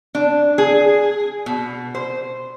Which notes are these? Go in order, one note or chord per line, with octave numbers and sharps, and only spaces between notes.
D4
G#4
B2
C5